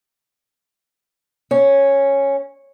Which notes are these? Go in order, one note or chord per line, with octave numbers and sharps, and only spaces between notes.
C#4